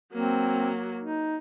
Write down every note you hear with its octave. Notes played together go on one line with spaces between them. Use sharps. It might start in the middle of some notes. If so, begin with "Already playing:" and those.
F#3 A#3 C4
D#4